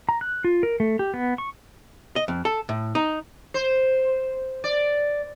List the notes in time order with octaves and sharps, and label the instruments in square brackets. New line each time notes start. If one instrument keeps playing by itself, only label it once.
[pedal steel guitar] A#5
F#6
F4
A#4
A3
G4
B3
C#6
[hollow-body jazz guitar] D#5
F2
A4
A2
D#4
[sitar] C5
D5